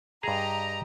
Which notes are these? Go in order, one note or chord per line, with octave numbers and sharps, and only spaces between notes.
G2 G4 G#4 D#5 A#5